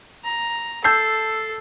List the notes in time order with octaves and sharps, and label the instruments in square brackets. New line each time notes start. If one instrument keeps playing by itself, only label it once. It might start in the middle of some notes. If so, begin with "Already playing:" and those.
[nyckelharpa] A#5
[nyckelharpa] A4 [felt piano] A5 E6 G6 [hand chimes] C7